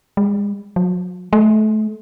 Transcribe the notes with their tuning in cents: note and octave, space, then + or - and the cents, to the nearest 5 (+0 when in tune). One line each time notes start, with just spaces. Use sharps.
G#3 -35
F#3 -40
A3 -30